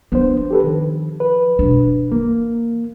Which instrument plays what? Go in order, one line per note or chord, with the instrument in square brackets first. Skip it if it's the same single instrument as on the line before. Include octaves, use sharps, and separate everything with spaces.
[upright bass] F3 D4 [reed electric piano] B3 C5
[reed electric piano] G4 A4 B4
D#3
B4
[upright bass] B2 D4
[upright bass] E3 [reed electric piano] A#3